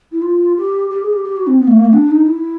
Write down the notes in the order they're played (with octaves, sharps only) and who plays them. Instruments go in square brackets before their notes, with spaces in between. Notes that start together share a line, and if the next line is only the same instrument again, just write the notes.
[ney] E4
F4
G4
G4
G#4
G4
G4
F#4
C4
B3
A3
A#3
A3
D4
D#4
E4